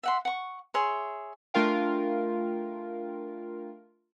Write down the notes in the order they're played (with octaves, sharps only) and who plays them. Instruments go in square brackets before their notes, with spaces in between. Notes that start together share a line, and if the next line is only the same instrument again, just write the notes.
[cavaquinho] E5 F#5 C6
F#5 C#6
G#4 C#5 E5 C6
[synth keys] A3 D4 F4 A#4 F5 G5